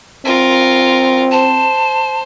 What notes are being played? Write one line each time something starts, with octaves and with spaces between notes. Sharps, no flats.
C4 F4 A#4
C5 A5